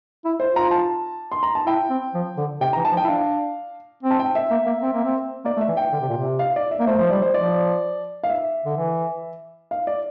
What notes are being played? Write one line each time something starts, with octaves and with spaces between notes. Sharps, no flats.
E4
C5
F4
A#5
A5
C6
A#5
A5
E4 G5
C4
F3
D3
C3 G5
A#5
E3
A5
F3
G5
E4
D4 F5
C4
A5
G5
E5
A#3
A#3
C4
A#3
C4
A#3 D5
A3
E5
E3
G5
D3
C3
A#2
C3
F5
D5
E5
A#3
A3 C5
F3 C5
G3 D5
C5
F3 D5
F5
E5
D3
E3
F5
D5